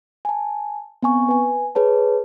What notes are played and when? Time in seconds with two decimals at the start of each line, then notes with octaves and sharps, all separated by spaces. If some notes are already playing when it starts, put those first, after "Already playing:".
0.25 G#5 A5
1.03 B3 C4 G#5 C#6
1.29 B4 G#5
1.75 G#4 B4 C#5 A5